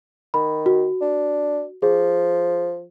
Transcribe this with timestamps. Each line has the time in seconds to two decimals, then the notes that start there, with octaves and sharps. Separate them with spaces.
0.34 D#3 B5
0.66 F#4
1.01 D4
1.82 F3 G#4